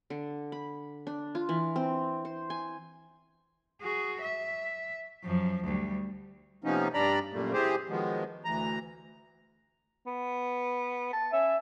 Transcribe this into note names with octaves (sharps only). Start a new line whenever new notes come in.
D3
B5
D4
F4
E3
C4
C5
G#5
F#4 G#4
E5
F#2 F3
D2 G3
C3 F3 A#3 B3 C#4 D#4
G2 G3 D4 D5 A#5 B5
F#2 A#2 G3 A3 A#3
E3 C4 G4 G#4 C5
D#3 F3 F#3 G#3 B3
D2 E3 A#5
B3
A5
C#4 E5